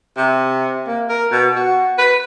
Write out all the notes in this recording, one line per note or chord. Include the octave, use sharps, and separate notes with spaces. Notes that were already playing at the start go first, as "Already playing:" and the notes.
C3
A#3
A#4
B2
F#4
B4